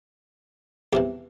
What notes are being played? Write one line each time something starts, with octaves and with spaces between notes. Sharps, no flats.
E2 C3 E3 G4